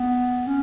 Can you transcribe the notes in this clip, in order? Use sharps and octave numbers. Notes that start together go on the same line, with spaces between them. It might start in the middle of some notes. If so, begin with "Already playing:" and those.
Already playing: B3
C#4